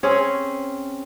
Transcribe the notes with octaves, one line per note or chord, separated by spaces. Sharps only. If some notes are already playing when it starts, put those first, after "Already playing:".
C4 C#4 G#4